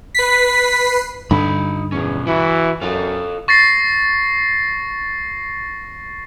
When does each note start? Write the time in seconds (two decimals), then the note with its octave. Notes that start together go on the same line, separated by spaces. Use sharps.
0.14 B4 B6 C7
1.31 G2 D3 D#4 B5
1.92 B1 E2 C#4
2.27 E3 E4 F#4
2.81 F#2 F4 A4 F5
3.48 C#6 A6 A#6 C7